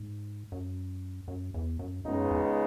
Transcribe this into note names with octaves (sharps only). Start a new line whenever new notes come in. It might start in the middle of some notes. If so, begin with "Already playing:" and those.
Already playing: G#2
F#2
F#2
E2
F#2
C#2 F#2 C#3 G#3 B3 D#4
E2